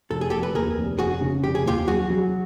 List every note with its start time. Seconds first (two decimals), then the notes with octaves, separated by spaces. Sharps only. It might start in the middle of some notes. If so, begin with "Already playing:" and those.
0.10 F1 A4
0.21 G#4
0.30 F1 G4 A4
0.43 B4
0.54 D#2 G#4 A#4
0.77 F1
0.99 F1 F#4 G#4
1.21 C#3
1.43 F1 G4
1.55 G#4
1.66 D#2 F4 G4
1.87 F#3 F#4 G#4
2.10 F#3